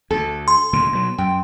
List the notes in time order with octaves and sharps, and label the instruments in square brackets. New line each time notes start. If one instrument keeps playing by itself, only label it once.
[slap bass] D2 [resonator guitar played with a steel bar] A4
[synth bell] C6
[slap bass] D2 A#2 C#3
B2 F#3
[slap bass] F#2 [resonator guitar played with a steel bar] G5